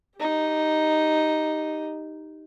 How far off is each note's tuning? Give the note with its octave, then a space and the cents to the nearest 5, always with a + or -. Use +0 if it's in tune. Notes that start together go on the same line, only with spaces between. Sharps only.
D#4 +0 G4 +0